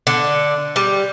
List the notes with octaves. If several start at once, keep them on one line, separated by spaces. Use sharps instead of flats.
D3
G3